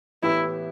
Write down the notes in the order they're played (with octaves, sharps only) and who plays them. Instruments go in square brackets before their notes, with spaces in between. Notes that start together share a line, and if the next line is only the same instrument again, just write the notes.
[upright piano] A2 E3 B3 G4 B4 [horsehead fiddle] E4